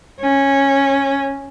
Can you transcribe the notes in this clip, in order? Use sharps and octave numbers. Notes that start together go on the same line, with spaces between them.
C#4